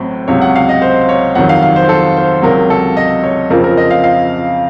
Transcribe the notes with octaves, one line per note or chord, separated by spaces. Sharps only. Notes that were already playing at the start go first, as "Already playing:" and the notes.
Already playing: A1 A2 F#3 C4
C#2 C3 F#3 C#5
F#5
F5
D#5
C5
C#5
F2 C3 D#3 F#3 F#5
F5
F5
C5
A4
C5
C#2 C3 F#3 A#4
A4
D#5
C#5
F2 C#3 F3 C4 F4 A#4
A#4
D#5
F5
F5